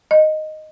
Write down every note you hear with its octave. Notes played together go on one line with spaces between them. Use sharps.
D#5